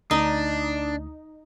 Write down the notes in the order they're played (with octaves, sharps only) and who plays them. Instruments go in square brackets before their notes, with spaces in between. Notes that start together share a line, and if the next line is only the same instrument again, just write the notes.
[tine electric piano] D2 [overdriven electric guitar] D4 [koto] D#4